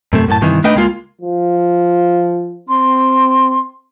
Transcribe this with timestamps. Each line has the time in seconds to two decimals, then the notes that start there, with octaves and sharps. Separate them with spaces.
0.13 F#2 C3 A3
0.28 F#2 A2 A5
0.42 G2 C3 D#3 E3
0.64 A3 D4 D#4 B4 D#5 G5
0.76 C#2 G#3 A#3 F4
1.21 F3
2.69 C4 C6